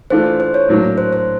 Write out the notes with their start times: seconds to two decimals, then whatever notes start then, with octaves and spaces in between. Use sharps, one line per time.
0.10 E3 A3 D4 F4 A4 C5
0.40 C5
0.54 C#5
0.69 A2 F#3 A#3 D4
0.98 C5
1.13 C5